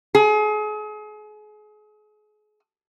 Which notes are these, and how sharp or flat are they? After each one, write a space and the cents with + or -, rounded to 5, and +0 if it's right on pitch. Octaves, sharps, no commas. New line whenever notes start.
G#4 +35